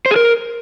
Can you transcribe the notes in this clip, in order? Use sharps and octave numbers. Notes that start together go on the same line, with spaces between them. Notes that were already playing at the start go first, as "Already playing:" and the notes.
C5
G#4
A#4